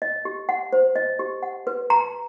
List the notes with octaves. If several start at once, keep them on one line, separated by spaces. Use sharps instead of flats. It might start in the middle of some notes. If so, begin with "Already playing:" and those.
D#5
G4
F#5
C5
D#5
G4
F#5
B4
A#5